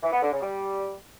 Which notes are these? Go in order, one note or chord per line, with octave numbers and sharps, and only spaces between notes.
E3
B3
D3
C#3
G3